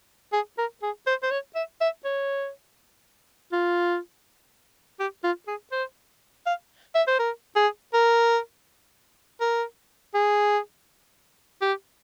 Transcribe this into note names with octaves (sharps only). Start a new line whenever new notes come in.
G#4
A#4
G#4
C5
C5
C#5
E5
E5
C#5
F4
G4
F4
G#4
C5
F5
E5
C5
A#4
G#4
A#4
A#4
G#4
G4